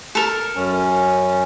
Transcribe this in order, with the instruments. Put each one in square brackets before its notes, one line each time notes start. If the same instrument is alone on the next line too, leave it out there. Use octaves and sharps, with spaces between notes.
[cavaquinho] A4 A#4
[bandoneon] F#2 C#4